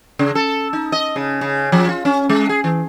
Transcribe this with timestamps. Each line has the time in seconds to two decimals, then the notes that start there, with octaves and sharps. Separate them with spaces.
0.19 C#3
0.35 A4
0.73 D#4
0.92 D#5
1.16 C#3
1.41 C#3
1.72 F3
1.89 F4
2.05 C#4
2.29 G#3
2.49 G#4
2.64 E3